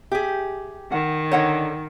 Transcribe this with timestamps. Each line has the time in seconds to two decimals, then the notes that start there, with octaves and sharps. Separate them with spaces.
0.12 G4 G#4 E5
0.92 D#3 F#5
1.32 D3 D#4 A4 C#5 D#5 F#5